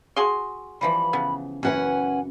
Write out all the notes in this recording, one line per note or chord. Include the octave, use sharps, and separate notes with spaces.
F#4 G#4 C6
E3 F3 G3 B5
C#3 B3
F#2 E3 C#4 B4 F#5 G#5